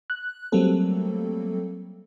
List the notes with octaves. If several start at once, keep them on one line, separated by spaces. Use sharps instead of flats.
F#6
F#3 G3 A3 A#3 C4 A4